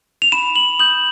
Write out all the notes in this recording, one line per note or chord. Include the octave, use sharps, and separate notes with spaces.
F7
B5 E7
F#7
D#6 G6 F#7